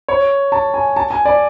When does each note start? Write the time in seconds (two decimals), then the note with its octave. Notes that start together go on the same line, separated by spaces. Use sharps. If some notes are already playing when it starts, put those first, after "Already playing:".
0.08 C#5
0.52 A5
0.74 G#5
0.96 A5
1.11 G#5
1.25 D5